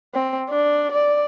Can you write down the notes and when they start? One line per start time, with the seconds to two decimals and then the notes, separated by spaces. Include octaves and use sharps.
0.14 C4
0.50 D4
0.92 D5